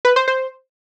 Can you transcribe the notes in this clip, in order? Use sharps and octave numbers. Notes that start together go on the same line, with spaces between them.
B4
C5
C5